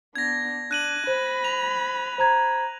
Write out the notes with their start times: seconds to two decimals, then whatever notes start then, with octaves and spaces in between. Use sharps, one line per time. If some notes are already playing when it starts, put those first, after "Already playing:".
0.16 B3 D4 G#6 A#6
0.71 D4 F#6 D#7 F#7
1.07 C5 B5
1.44 F7
2.18 C5 A#5 G#6